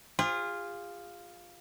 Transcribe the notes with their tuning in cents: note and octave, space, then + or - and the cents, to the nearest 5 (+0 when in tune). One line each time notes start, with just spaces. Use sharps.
F4 +0 G#4 -40